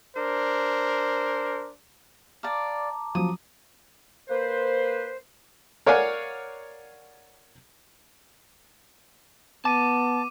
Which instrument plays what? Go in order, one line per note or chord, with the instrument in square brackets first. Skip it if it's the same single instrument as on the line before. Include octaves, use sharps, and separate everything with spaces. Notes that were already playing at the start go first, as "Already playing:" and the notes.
[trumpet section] D4 A#4 C5
[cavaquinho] D5 F5 [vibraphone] A5 A#5 D6
[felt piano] F3 F#3 [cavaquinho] D#6
[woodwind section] A#3 B4 C5
[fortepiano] A#4 C#5 D5 F5 F#5 G#5
[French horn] B3 [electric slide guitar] A5 [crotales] D6 D#7